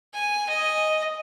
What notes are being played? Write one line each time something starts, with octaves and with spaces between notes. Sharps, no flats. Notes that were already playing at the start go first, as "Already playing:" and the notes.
G#5
D#5